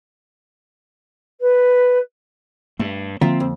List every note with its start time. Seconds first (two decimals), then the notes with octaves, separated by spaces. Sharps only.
1.41 B4
2.79 G2 A3
3.21 D3 F3 A#3 C4 F4 E5 A#5
3.40 F2